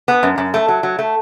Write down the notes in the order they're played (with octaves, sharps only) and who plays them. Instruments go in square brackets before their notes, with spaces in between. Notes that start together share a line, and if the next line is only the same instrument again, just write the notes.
[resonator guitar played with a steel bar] B3
F#2
F#2
A3
F#3
F#3
A3